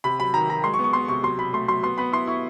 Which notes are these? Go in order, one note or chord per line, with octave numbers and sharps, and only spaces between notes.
C3 B5
F#3 B5
D#3 A#5
F#3 A#5
G#3 C6
C#6
B3
C#6
B3 C6
C3 C#6
F#3 C6
B2 B5
A3 C6
F#3 C6
B3 C6
B3 B5
E4 C6
E4 C#6